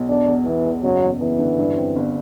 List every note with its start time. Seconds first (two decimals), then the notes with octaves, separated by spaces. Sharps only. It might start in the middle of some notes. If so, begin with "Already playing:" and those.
Already playing: B1
0.09 E2 D4
0.28 E2
0.46 E2 E3
0.65 E2
0.83 F#1 F#3
1.02 E2
1.21 E2 E3
1.39 D3
1.59 G2
1.77 C4
1.96 G1